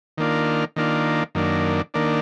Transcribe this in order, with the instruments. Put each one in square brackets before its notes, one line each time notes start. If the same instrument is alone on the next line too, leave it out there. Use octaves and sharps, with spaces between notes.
[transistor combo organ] D#3 A#3 D4 F4
D#3 A#3 D4 F4
F#2 D#3 A#3 D4
D#3 A#3 D4